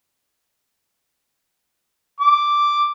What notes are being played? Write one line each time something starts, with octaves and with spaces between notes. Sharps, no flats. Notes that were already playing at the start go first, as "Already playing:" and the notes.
D6